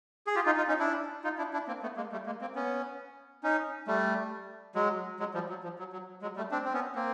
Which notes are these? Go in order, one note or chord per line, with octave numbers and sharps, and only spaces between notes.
G#4
F4 G4
D#4 F4
D#4 F4
C#4 D#4
D4 E4
D#4 F4
D4 E4
D4 E4
A#3 C4
A3 B3
G#3 A#3
G3 A3
G#3 A#3
A#3 C4
B3 C#4
C#4 D#4
G3 A3
F#3 G#3
F#3 G#3
F3 G3
F#3
F3
F#3
F#3
F#3 G#3
G3 A3
C4 D4
C4
B3 C#4
A#3 C4